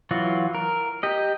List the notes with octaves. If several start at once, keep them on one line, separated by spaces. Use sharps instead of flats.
E3 F#3 F4 F#4
A#4
G4 D#5